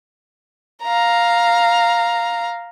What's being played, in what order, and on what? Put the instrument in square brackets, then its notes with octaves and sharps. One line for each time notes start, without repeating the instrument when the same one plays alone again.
[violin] F5 A#5